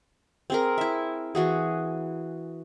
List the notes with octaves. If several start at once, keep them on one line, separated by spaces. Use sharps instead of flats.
C4 G#4 A#4
E4 E5
E3 F#4 G#4